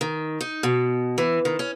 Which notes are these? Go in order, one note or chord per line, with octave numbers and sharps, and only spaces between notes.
D#3
D#4
B2
E3
D#3
C#4